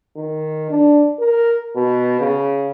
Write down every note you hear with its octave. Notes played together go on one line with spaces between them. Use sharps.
D#3
D4
A#4
B2
C#3